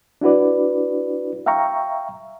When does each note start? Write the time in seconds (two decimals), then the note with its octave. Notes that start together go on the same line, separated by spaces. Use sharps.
0.21 D4 E4 F#4 B4 D5
1.46 E5 F5 G5 A#5 C#6